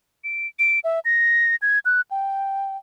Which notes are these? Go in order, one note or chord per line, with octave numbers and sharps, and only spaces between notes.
D7
D7
E5
A#6
G#6
F#6
G5